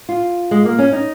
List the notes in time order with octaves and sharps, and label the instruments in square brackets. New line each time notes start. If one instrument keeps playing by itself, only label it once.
[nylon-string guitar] F4
G#3
A#3
C#4
D#4